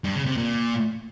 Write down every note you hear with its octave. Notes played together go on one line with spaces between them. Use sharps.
G2
C#3
C3
A#2